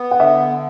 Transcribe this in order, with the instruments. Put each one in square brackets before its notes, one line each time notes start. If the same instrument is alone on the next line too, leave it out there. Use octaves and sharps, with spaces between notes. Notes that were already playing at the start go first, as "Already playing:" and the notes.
Already playing: [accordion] B3
[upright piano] F#5
[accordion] D3 [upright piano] E5